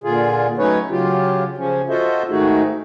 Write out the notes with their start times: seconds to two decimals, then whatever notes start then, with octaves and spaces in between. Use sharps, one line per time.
0.04 A#2 D3 F4 G#4
0.59 F#3 A3 C#4 D#4 B4 C#5
0.90 C#3 F#3 F4 G4
1.58 C#3 F3 C#4
1.89 F4 F#4 A4 C5 D#5 E5
2.30 G#2 D#3 A3 D#4 F#4 G#4